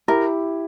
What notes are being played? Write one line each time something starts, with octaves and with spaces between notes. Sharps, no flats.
E4 G4 A#4